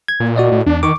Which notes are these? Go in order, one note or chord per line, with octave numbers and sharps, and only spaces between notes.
G#6
A#2
F#4 D5 D#5
A2
E2 D4
D#3 C#6 D6